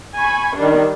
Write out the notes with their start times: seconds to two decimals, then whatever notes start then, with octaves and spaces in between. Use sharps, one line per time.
0.16 G#5 B5 C#6
0.55 D#3 G3 D4